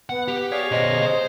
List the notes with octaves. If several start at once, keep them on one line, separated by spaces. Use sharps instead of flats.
B3 F#5
G4
G#4 C#5 D5 F5
B2 C5 D#5
C5